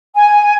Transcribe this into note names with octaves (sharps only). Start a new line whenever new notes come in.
G#5